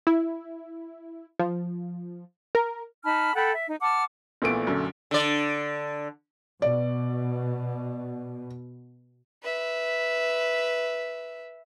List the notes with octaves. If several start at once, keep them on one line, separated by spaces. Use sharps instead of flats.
E4
F3
A#4
D#4 A5 B5 F6
A4 F#5 G5 B5
E5
D#4
F#5 A5 D6 F6
A#1 A#2 E3 A3 B3 D7
F#2 D3
D3 D5
B2 D5
B4 E5